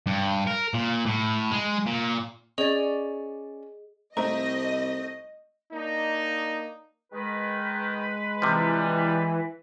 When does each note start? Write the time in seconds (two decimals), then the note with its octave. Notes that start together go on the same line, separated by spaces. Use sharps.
0.06 G2
0.47 A#4
0.74 A#2
1.06 A2
1.51 G#3
1.86 A#2
2.58 C#4 G#4 D5 D#5
4.17 C2 A3 C4 D#4 D#5 A#5
5.72 A#3 D4 D#4
7.13 D#3 G#3 B4
8.42 C3 E3 F3 G3